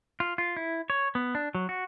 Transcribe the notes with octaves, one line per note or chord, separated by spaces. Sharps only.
F4
F4
E4
C#5
B3
D4
F#3
F#4